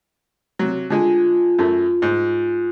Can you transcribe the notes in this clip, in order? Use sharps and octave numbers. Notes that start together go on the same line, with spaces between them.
C3 F#3
D3 G#3 F4 G#5
F#2 A3
G#2